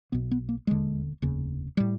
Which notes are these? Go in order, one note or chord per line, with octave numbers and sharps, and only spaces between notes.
B1 B2 B3
B3
A#3
E1 D#2 D3 G#3
F1 D#2 C#3
A2 G3